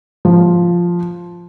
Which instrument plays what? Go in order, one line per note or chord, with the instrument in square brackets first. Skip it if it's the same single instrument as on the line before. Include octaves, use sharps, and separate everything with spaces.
[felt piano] F3